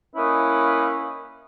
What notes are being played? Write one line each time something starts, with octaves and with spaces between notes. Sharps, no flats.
A#3 C#4 D#4 E4 B4